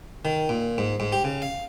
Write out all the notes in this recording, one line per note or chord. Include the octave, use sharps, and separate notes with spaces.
D#3
A#2
G#2
G#2
G4
C#3
F5